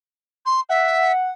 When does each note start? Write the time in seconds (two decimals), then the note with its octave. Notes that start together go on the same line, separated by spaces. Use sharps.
0.46 C6
0.69 E5 F#5